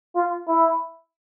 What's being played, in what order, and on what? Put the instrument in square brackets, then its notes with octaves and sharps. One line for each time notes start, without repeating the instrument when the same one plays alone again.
[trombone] F4
E4